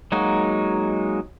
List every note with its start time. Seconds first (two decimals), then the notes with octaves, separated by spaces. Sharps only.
0.12 F#3 G#3 A#3 D#4 F#4